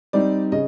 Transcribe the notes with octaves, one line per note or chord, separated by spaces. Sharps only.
G3 C4 D#4 D5
C#3 D#5